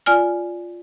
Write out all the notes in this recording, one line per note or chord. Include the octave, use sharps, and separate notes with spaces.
F4 D5 G#5 F6